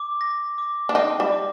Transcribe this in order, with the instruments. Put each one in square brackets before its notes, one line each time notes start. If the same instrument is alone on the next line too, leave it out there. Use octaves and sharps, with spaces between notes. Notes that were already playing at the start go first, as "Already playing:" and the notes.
Already playing: [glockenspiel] D6
A#6
D6
[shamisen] D4
[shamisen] C4 D#4 [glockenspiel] A#6
[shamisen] G3
[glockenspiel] D6